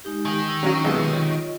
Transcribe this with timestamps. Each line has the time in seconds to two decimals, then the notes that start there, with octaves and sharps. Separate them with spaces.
0.05 G#3 D#4 G4
0.25 D#3 G#5
0.47 E6
0.63 F#3 C#4 F#4
0.84 B1 C3 G#3 F4 B4 E6
1.11 F4 C#5 D#5